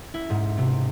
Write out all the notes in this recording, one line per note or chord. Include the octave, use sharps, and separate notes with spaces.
E4
G#2
C3